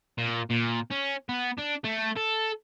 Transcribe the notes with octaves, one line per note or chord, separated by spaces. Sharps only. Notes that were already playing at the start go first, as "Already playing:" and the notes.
A#2
A#2
C#4
B3
D4
A3
A4